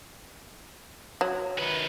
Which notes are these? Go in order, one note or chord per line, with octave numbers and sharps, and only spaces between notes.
F#3
D#3 B4